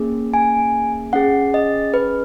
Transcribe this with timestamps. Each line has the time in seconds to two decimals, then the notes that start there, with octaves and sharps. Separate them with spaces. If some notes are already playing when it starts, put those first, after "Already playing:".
Already playing: A#3 C#4 G#4
0.34 G#5
1.13 C#4 G#4 F#5
1.54 D#5
1.94 B4